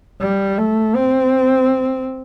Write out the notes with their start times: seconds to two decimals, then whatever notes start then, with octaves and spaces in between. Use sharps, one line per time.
0.22 G3
0.58 A3
0.96 C4